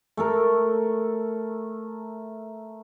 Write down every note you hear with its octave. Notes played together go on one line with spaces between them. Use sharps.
A3 A4 A#4